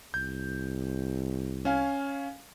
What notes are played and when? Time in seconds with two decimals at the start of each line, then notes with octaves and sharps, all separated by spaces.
0.14 C2 G6
1.65 C#4 F5 G#5